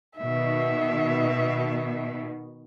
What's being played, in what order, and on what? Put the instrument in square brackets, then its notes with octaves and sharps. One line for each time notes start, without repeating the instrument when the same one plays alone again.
[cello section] B2 D#3 [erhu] E5